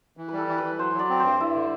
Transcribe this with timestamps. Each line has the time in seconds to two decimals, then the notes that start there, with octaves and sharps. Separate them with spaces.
0.17 E3
0.28 G3 B4
0.38 A4
0.48 E3
0.58 B4
0.64 E3
0.79 F#3 C5
0.94 F#3
0.99 D5
1.09 C4
1.19 G2 C5
1.39 G2 E4
1.55 D3